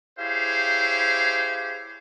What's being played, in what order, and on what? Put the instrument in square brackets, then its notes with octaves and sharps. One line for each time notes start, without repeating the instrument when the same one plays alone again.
[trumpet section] E4 G4 G#4 C5 C#5 F5